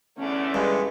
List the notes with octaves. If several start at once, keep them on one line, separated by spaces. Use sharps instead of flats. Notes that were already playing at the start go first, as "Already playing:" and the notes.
E2 D3 A3 C#4 D5
G2 G#3